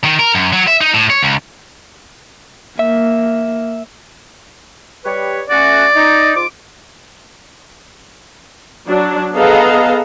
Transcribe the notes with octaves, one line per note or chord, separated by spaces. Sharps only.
D#3
A#4
F#2
F#3
E5
D#4
A2
C#5
C#2
A#3 E5
G3 B4 C#5
A3 C#4 F#4 D5
D#4
G#2 F4 D6
F#3 D4
B3 G#4 A4 D#5 F5 A#5